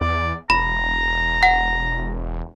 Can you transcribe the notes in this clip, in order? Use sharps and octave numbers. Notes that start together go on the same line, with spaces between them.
E2 D5
E1 A#5 B5
F#5